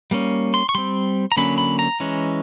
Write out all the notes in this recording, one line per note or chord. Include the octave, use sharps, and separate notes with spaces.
G3 A#3 C#4
C6
C#6
G3 C4 C6
A#5
D3 F#3 A#3 C#4 B5
B5
A#5
E3 G#3 C#4